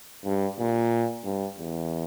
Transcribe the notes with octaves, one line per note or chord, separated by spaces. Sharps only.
G2
A#2
G2
E2